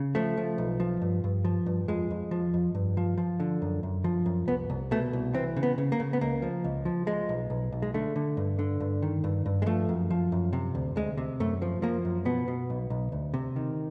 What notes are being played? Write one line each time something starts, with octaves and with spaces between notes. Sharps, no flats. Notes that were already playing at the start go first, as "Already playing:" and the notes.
Already playing: C#3
F3 A3
F3
B1
F3
G2
G2
F3
G2
F2 G#3
F2
F3
F2
G2
F3
F3
D3
F#2
F#2
F3
F#2
C2 B3
C2
B2 A3
C2
E3 C4
C#3
B3
C#3
A#3
C#3
B3
C#2 A#3
F3
C#2
F3
F3 G#3
B1
B1
B1
G#3
D3 A3
D3
G2
D3
G2
D#3
G2
G2
G#3
F3 A3
F#2
F3
F#2
C3
D2
D2 G#3
C3
F#2 A3
F3
F3 A#3
F#2
B2 B3
B2
B1
B1
D2
C3
D#3